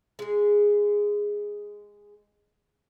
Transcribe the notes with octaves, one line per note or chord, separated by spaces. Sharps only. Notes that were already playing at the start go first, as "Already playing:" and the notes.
G#3 G#4